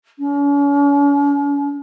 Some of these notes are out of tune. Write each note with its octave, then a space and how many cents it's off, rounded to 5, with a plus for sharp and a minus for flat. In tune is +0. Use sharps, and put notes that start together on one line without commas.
C#4 +45